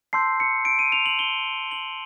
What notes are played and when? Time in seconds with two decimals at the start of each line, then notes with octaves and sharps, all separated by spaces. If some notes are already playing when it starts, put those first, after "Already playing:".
0.13 A5 C6 E6 G6 C7
0.40 C#7
0.65 D7
0.79 D#7
0.92 F7
1.06 F#7
1.19 G7
1.71 F#7